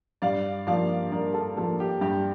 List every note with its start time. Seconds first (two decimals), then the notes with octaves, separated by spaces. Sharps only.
0.22 G2 D5 F5
0.67 F3 A#3 D5 F5
1.12 G2 A#4 D5
1.34 A4
1.57 F3 A#3 A4
1.80 G4
2.01 G2 G4